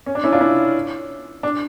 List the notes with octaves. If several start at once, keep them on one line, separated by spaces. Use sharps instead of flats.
C#4
D4
C#4 E4
D4 F4
C#4 E4
D4